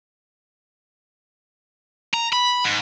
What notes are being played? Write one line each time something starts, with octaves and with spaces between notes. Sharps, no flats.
A#5
B5
G#2